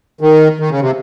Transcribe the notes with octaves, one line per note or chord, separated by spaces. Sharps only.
D#3
D#3
C#3
C3